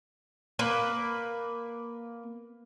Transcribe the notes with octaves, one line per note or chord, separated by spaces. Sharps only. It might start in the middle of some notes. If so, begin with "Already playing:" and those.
A#3 B4